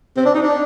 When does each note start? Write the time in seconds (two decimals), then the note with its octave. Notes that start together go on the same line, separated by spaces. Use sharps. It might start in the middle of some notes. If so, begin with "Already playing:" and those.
0.17 C4
0.25 D4
0.34 D#4
0.43 D4